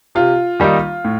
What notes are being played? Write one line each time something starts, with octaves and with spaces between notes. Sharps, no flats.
C3 F4
D#3 G3 A#3 D#4
A2